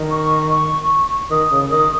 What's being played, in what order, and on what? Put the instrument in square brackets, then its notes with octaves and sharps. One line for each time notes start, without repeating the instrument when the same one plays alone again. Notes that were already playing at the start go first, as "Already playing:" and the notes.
Already playing: [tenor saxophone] D#3
[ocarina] C#6
C#6
[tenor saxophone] D#3 [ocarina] D#6
[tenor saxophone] C#3
[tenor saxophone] D#3 [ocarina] D#6